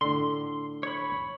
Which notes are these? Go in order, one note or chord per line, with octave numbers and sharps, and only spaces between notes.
A2 D3 C6
C#5 B5